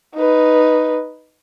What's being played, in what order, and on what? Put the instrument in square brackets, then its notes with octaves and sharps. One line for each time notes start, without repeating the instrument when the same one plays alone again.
[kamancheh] D#4 B4